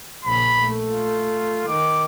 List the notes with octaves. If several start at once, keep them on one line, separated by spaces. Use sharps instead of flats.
A#1 C#3 B5
A3
F4
D#3 D6